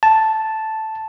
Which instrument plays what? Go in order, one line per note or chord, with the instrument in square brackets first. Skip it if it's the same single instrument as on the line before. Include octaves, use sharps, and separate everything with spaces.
[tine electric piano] A5